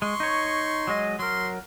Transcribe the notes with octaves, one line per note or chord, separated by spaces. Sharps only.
G#3 C6 C#6
D#4 C#5
F#3 G#3 D#5
F#3 A#4 C6